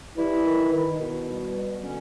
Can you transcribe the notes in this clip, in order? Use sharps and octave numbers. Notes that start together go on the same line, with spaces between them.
E3 G3 E4
D#3
D#3
B2
G3
B2
D3 C#4